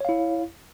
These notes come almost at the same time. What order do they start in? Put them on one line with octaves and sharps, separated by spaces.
C#5 F5 E4